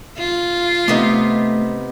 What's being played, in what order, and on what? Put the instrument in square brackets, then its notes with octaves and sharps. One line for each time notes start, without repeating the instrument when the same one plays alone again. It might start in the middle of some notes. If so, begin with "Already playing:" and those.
[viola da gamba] F4
[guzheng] C3 B3 D#4 [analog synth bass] A3